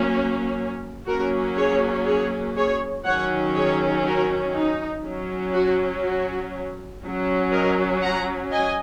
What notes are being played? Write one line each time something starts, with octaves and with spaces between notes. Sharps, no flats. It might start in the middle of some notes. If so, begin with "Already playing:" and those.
Already playing: F#3 A#3 C#4
F#3 A#3 C#4 F#4 A#4
G#4 C#5
G#4 C#5
G#4 C#5
D#3 F#3 C#4 C#5 F#5
G#4 C#5
F#4 A#4
D#4
F#3 C#4
F#4
F#4
F#3 C#4
A#4 D#5
F#5 A#5
D#5 G#5